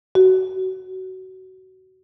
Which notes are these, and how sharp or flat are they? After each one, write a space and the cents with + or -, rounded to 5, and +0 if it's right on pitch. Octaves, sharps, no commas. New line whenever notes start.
F#4 +20